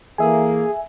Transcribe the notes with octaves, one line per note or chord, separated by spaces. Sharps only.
E3 A#3 G#4 A4 E5 G#5